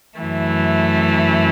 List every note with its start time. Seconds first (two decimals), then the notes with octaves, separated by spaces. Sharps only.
0.21 F#2 E3 A3